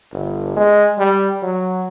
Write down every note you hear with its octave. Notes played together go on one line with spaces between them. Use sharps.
G1
G#3
G3
F#3